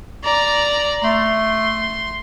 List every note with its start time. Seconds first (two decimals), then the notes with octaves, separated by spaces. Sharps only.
0.23 D5 A#5
1.04 A3 C6